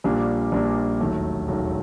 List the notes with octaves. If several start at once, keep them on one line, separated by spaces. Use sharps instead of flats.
A#1 A#2 G3 A#3 D4
A#1 A#2 G3 A#3 D4
E1 D#2 D#3 F#3 A3
E1 D#2 D#3 F#3 A3